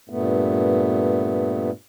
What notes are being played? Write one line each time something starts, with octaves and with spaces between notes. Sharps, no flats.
G2 A#2 A3 B3